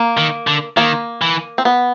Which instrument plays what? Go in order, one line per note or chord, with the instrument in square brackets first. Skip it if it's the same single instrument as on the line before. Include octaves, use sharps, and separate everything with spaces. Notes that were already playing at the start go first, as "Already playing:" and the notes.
Already playing: [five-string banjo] A#3
[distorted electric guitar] D#3
D3
[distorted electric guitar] D#3 [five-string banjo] A#3
[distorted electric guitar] E3
[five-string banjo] C4
B3